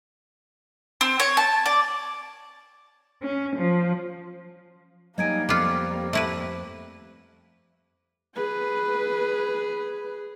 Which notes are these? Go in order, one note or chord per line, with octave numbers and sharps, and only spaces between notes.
C4
C#5
A5
D5
C#4
F3
F#3 G3 A#3 D#4 D#5 G#5 G#6 D7
F2 B3 F4 D6 F#6 C#7
A3 E4 B4
G#4 B4